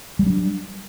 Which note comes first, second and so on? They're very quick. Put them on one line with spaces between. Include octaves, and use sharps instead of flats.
G3 F#3 C#4 D4